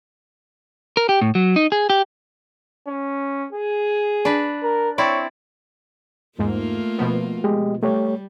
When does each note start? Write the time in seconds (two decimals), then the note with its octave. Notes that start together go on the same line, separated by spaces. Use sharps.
0.97 A#4
1.09 G4
1.21 A2
1.35 F#3
1.56 D#4
1.72 G#4
1.90 G4
2.88 C#4
3.53 G#4
4.25 D4 B4
4.63 A#4
4.98 C4 E4 C#5 D5
6.38 E2 G#2 A3 A#3 F4
6.98 B2 F3 B3
7.44 G#3 G4 D#5
7.83 G3 A3 G4 C#5